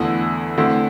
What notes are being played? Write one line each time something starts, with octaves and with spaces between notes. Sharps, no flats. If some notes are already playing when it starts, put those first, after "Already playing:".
Already playing: E2 D3 A3 E4
D3 A3 C4 E4